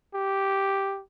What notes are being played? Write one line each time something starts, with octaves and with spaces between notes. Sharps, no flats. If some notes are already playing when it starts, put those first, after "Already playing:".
G4